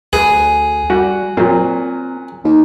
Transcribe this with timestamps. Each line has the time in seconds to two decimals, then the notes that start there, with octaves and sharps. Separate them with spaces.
0.13 D2 G#4 B4
0.90 G3 F#4
1.37 A#2 F#3 C4
2.44 D#2